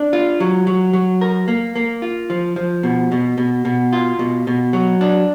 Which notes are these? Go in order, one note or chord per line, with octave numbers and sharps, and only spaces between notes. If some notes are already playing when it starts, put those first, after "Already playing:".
Already playing: D4
F4
F#3
F#3
F#3
A#4
A#3
A#3
F4
F3
F3
B2
B2
B2
B2
F4
B2
B2
F#3
D4